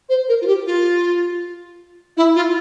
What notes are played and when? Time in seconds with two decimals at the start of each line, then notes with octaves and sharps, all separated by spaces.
0.09 C5
0.29 A#4
0.42 F4
0.47 G4
0.66 F4
2.17 E4
2.36 F4